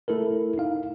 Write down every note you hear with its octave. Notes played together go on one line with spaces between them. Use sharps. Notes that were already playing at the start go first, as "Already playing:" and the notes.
A3 E4 A4 A#4
D#4 F5